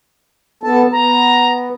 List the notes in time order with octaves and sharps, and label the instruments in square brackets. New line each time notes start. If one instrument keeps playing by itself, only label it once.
[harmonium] B3 A4 A5
[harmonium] B3 [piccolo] A#5